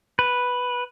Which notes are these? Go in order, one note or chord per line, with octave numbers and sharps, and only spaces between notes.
B4